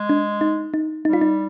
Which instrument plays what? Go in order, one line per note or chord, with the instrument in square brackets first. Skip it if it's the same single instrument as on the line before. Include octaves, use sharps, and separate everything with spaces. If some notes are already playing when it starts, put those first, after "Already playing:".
Already playing: [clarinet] G#3
[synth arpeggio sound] D4
D#4
D#4
[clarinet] G3 [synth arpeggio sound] D#4
[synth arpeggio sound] F4
D#4